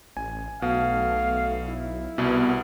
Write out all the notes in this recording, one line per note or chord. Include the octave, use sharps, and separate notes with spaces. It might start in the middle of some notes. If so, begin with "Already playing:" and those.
A1 G#5
B1 B2 A3 F5
E4
C2 B2 B3